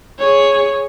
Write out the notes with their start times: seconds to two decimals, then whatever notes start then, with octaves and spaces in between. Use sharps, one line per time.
0.19 G#4 C#5